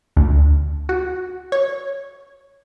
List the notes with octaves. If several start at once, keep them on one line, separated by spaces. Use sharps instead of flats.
D2
F#4
C#5